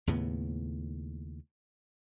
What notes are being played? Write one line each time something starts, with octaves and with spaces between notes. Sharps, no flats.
D#2 A2 C#3 B3